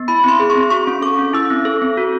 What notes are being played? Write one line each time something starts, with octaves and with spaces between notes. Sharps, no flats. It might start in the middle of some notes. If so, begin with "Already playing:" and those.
Already playing: B3
E4 B5
C4 C6
G#4
C#6
C4
F#4 C#6
C#4
A4 D6
C#4
E4 E6
C4
A4
C4
F#4